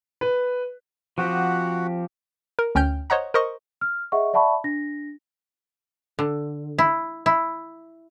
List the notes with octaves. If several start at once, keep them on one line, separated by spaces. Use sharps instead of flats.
B4
F3 C4 F#4 G4 F#5
A#4
D2 C#4 G5 F6 G6
C5 C#5 D#5 F#5 A#5
A#4 C5 D#5 C#6
F6
G#4 D#5 E5 F#5 C#6
D5 E5 F#5 A5 B5 C#6
D4 A#6
D3
E4
E4